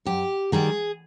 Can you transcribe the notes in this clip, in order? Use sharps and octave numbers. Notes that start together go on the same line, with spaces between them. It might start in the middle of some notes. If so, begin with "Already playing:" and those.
F#2 G4
D#3 G3 G#4